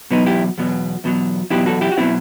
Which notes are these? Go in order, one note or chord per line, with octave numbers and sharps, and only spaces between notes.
E2 B2 F#3 B3 D#4
E4 G4
E2 B2 F#3
E2 B2 F#3
E2 B2 F#3 E4 G4
F#4 A4
E4 G4
F#4
B2 F#3 C4 E4